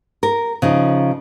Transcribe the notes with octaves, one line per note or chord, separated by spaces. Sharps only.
A#4
C#3 F3 D#4